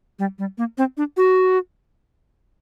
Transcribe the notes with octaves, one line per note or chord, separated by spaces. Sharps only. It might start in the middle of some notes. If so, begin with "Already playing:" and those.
G3
G3
A#3
C4
D4
F#4